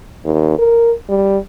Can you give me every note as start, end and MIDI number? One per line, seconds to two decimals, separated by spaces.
0.25 0.58 39
0.58 0.92 70
1.09 1.38 55